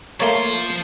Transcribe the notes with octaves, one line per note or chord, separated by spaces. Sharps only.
F3 A3 A#3 C#5 C6